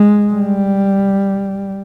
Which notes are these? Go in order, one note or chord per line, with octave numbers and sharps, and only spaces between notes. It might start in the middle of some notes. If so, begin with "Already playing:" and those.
Already playing: G#3
G3